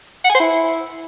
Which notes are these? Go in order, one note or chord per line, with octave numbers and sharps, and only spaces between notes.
F#5
G#5
C5
E4